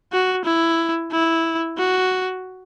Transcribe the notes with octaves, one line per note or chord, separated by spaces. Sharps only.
F#4
E4
E4
F#4